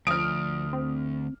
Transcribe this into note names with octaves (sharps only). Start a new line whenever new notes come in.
D2 F3 D#6 F6 D7
C4